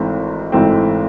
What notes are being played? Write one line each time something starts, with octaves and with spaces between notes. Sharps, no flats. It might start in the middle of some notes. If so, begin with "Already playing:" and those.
Already playing: G#1 G#2 E3 A3 C4
G#1 G#2 E3 A3 C4